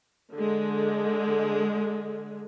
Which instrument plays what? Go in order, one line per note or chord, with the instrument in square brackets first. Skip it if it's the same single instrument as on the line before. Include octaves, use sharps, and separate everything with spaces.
[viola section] D3 G#3